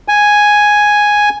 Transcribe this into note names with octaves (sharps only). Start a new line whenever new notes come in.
G#5